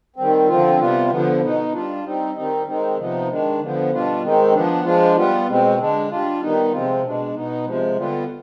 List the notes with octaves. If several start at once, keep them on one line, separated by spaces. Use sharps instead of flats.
D#3 G3 C4
D3 F3 C4 F4
C3 G3 B3 F4
D3 F3 B3
B2 B3 D#4
G3 D4 F4
G3 C4 D#4
D#3 G3 C4 D#4
D#3 G#3 C4 D#4
C3 F3 B3 D#4
D#3 G#3 D4
D3 F3 B3
B2 G3 D4 F4
D#3 G#3 C4 D#4
F3 B3 D4
F3 G#3 D4 F4
G3 B3 F4
B2 G#3 C4
D3 G#3 D4
G3 D4 F4
D#3 G3 B3 D#4
C3 F3 G#3 C4 F4
B2 G#3 D4
B2 B3 D#4
C3 F3 G#3
D3 G3 B3 F4